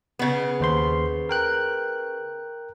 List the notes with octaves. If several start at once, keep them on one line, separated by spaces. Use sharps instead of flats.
C#3 B3
D#2 C5 C6
A#4 G5 F#6